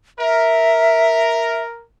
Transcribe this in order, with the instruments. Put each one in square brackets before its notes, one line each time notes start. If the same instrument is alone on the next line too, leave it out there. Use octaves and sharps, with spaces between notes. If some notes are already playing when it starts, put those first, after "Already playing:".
[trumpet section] A#4 [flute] E5